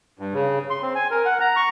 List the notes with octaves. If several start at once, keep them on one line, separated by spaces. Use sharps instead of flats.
G2
C#3
C6
C4
G#5
A#4
F#5
A#5
C#6